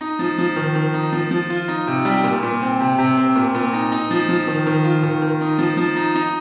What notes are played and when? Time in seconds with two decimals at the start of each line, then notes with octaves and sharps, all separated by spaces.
0.01 D#4
0.19 F3
0.38 F3
0.56 D#3
0.75 D#3
0.94 D#4
1.12 F3
1.31 F3
1.50 F4
1.68 D#4
1.87 C3
2.05 G3
2.24 A#2
2.43 A#2
2.61 C4
2.80 C3
2.98 C3
3.17 C4
3.35 A#2
3.54 A#2
3.73 D#4
3.92 D#4
4.11 F3
4.29 F3
4.47 D#3
4.66 D#3
4.84 F4
5.03 D#3
5.22 D#3
5.41 D#4
5.58 F3
5.77 F3
5.96 D#4
6.15 D#4